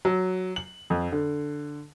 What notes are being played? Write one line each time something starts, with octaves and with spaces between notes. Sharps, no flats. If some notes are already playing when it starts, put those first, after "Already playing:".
F#3
F#7
F2
D3